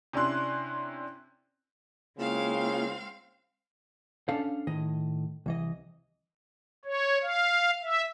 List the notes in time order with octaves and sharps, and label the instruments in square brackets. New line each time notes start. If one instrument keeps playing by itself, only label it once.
[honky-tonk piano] C3 C#4 D4 E4 C6 F#6
[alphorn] C#3 [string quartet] G#3 C4 F5 [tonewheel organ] A#3 E4 F4
[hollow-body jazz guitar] C#4 D4 A4 F5
A2 D#3 D#5
C2 E3 D#5
[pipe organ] C#5
F5
E5